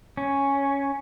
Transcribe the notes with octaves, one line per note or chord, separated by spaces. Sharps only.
C#4